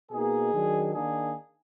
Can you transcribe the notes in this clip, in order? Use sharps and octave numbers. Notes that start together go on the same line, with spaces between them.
B2 A#3 D#4 G#4
D#3 F#3 D4
D#3 A#3 D4 G#4